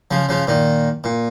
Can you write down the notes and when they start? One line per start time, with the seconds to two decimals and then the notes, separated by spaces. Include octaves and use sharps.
0.11 C#3 F3
0.29 C#3 F3
0.47 A#2 D#3
1.04 A#2